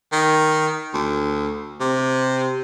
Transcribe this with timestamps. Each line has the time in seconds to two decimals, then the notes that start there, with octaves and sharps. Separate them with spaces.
0.12 D#3
0.94 D2
1.80 C3